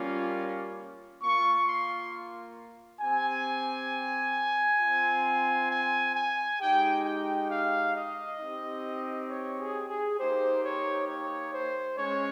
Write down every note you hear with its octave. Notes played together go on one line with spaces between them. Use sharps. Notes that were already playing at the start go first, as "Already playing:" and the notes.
Already playing: G3 A#3 C#4 F4
A#3 F4 C#6
C6
C4 G4 G#5
C4 F4
G#5
G#5
G#3 D#4 G4 G5
G5
F5
D#5
C4 D#4 G4
C#5
G#4
G#4
A#3 D#4 G4 C5
C#5
C#5
C5
G#3 C#4 C#5